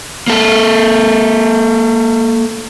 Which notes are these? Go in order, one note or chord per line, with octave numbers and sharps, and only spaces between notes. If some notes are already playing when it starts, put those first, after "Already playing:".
A#3 A4